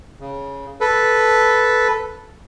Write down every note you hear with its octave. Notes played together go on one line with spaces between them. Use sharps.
C#3
A4 B4